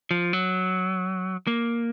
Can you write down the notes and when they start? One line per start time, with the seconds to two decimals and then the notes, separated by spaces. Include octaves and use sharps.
0.11 F3
0.33 F#3
1.47 A#3